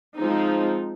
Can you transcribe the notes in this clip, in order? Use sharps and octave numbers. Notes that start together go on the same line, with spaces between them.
F3 G#3 C4 D#4